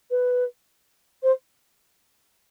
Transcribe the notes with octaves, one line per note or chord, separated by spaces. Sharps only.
B4
C5